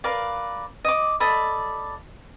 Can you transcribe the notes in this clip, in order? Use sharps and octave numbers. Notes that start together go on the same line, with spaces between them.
A#4 B4 D5 F5
D#5 D6
A4 D5 D#5 B5